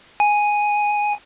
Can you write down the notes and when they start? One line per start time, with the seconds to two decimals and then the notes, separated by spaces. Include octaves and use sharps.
0.20 G#5